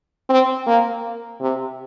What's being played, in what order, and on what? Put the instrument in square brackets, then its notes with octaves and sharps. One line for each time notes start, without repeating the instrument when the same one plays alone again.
[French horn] C4
A#3
C3